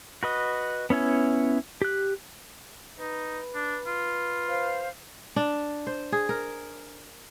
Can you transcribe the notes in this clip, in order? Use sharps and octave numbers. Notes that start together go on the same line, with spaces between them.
F#4 B4 D#5
B3 C#4 E4 G#5
G4 F#6
D#4 B4
D4
F4
C5 F5
D4
C5
G#4
A#4